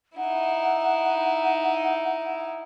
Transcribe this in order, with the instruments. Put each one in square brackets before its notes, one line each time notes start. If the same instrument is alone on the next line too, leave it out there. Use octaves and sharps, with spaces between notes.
[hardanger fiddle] D#4 E4 [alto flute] F#5